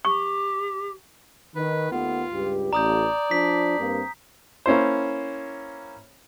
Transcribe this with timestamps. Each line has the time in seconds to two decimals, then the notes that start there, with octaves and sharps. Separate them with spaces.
0.05 G4 C#6
1.56 D#3 B4
1.92 D#2 A3 B3 F4
2.33 C#2 G2 G4
2.73 A1 D5 A#5 D#6 G6
3.31 F3 D4 B6
3.79 G2 A#3 C4
4.66 A#3 C#4 E4 C5